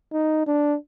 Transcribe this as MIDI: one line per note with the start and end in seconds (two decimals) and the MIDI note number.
0.12 0.43 63
0.47 0.75 62